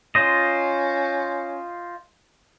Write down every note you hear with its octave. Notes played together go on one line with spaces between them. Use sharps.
C#4 F4 C5 D#5